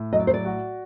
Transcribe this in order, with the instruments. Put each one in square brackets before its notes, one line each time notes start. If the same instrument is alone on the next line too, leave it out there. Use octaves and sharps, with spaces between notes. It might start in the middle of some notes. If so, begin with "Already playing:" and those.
Already playing: [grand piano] A2
[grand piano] F#3 [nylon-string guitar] D#5
[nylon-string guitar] D5
C5
D5
[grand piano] F#4